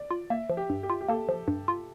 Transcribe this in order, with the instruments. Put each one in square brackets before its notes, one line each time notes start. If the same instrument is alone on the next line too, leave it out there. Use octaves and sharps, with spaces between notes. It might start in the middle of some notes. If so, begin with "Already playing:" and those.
Already playing: [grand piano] D5
[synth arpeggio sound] F4
[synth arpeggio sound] A#3 [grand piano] E5
[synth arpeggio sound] F3
[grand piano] G4
[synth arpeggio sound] G2
[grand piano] G4
[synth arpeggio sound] F4
[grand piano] G4
[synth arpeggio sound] A#3 [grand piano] A4
[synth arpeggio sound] F3
G2
F4